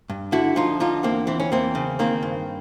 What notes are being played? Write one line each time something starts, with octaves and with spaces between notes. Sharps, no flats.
G2
D3 E4 F#4
F3 D#4 F4
D3 D#4 F4
E2 A#3 C4
E3 C4
C#4
E2 A#3 C4
C#3
D#3 A#3 C4
G2